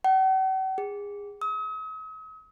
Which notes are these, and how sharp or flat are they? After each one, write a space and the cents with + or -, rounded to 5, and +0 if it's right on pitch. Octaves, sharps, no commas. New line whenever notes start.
F#5 +45
G#4 -25
D#6 +45